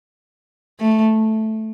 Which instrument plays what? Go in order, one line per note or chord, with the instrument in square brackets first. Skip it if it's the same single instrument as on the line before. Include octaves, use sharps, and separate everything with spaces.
[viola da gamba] A3